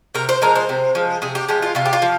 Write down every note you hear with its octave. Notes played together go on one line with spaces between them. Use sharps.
C3 A#4
C5
F3 G#3 A#4
C5
C3
F3 G#3
C3 G#4
G4
F3 G#3 G4
F4
C3 F4
G4
F4
F3